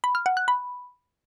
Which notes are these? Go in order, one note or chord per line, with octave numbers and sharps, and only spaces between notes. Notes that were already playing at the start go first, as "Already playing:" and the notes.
B5
F6
F#5
F#6
B5